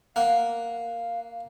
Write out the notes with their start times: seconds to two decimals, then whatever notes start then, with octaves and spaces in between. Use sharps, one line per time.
0.16 A#3 F5 F#5